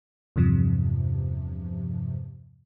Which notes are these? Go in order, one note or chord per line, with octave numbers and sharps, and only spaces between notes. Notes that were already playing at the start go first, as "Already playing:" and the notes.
E2 G2 C3 F3